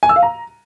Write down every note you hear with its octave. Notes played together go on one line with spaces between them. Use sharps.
G#5
E6
F5
A#5